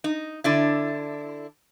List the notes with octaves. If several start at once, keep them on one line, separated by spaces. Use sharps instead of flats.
D#4
D3 D4 E4